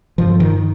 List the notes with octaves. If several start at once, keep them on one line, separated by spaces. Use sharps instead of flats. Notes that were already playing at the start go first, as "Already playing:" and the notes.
G2 F3
D#3